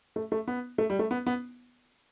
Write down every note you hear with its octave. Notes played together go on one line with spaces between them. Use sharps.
A3
A3
B3
A3
G3
A3
B3
B3